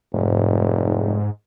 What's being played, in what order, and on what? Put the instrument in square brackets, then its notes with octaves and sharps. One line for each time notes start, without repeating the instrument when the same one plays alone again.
[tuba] F1 [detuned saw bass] G#2